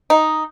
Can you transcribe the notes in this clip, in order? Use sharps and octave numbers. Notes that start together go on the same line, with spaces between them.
D#4